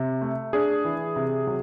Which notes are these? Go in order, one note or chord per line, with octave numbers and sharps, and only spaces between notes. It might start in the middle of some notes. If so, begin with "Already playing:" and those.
Already playing: C3
A3
D4 G#4
E3
C3
F#3